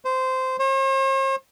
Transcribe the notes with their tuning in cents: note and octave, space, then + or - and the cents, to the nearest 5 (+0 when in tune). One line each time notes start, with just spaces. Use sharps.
C5 -15
C5 +45